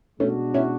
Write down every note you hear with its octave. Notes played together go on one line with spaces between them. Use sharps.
B2 G#3 A3 C#4 D4 F#4
C#4 E4